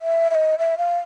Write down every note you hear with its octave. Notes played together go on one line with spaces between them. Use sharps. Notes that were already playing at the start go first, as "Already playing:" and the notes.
E5
E5
D#5
E5
F5